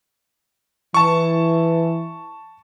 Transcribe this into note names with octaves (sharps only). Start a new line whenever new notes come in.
E3 A5 C#6